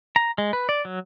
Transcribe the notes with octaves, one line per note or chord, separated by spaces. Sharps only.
A#5
G#3
B4
D5
F#3